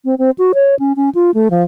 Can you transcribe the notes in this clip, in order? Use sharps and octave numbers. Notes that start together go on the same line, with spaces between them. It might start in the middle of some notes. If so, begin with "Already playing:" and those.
C4
C4
F#4
C#5
C#4
C#4
F4
A3
F3